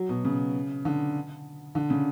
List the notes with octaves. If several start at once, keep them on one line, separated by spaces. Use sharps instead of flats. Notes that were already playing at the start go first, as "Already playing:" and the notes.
Already playing: F#3
B2
C#3
D3
D3
C#3